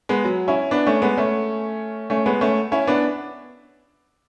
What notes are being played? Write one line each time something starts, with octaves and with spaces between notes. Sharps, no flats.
G#3 B3
F#3
C#4 E4
B3 D4
A3 C#4
G#3 B3
A3 C#4
A3 C#4
G#3 B3
A3 C#4
C#4 E4
B3 D4